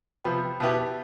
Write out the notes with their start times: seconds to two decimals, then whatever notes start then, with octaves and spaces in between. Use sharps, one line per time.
0.24 C3 F3 B3 G5 B5
0.60 B2 B3 E4 G4 B4 F5 A5